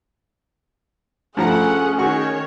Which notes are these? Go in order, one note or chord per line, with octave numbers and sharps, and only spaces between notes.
G2 F3 A3 C#4 G#4 F#5 A#5
D#3 F#4 C#5 F#5 C#6